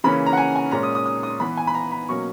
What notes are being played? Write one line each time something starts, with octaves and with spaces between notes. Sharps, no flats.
C#3 E3 A#3 C#4 B5
A#5
F#5
G#5
G#5
A#2 G#3 C#4 A#5
D#6
D#6
D#6
D#6
E3 B3 B5
G#5
B5
A#5
B5
B2 F#3 A#3 C#4 C#6